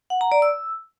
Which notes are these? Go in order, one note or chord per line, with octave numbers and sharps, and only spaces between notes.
F#5
A#5
D5
E6